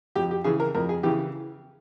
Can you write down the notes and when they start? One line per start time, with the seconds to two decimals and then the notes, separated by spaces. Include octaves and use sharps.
0.16 F2 G4
0.31 G4
0.44 C#3 E3 G#4
0.60 A#4
0.75 F2 A#4
0.89 G#4
1.03 C#3 E3 G4